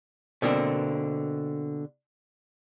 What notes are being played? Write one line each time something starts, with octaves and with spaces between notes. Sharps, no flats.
B2 D3 A#3 C4